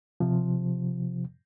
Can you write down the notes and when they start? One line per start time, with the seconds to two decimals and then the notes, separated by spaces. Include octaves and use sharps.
0.20 C3 F3